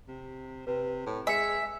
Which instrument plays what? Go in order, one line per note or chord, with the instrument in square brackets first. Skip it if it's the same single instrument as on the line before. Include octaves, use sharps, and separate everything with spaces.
[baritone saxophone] C3
[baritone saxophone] C3 [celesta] B4
[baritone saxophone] A2
[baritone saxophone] G#3 [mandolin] E5 [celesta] G#5 C#7